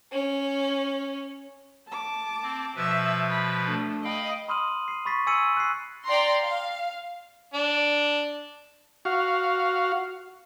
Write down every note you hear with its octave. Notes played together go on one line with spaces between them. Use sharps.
C#4
A5 D6
C4
B2 F3 B4 E5
B5
A3 D4
D#5 F5 G5 B5
B5 C6 D#6 F6 D#7 F#7
C7 D#7
B5 C#6 A6 B6 C7
G#5 E6 G#6 C#7 D#7 F#7
F#6 C7
D5 G5 A#5 C6
F5
D4
F#4 F5